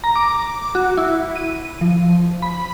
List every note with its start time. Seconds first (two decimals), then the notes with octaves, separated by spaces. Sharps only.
0.04 A#5
0.15 D6
0.75 F#4
0.97 E4
1.36 D#7
1.81 F3
2.42 B5